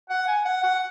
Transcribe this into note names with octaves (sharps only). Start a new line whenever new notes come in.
F#5
G#5
F#5
F#5